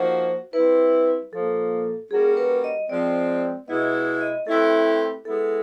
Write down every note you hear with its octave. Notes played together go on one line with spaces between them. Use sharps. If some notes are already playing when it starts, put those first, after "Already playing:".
Already playing: F3 A#3 D#4 F#4 C5
G3 C4 E4 B4
A#2 F3 A#3 A4
G3 A#3 C#4 F#4 G#4 A#4
B4
D#5
F3 G#3 C4 D5
B2 G#3 B3 E4 D#5
E5
D#5
A3 C4 E4 G4 A4 B4
G#3 B3 E4 A4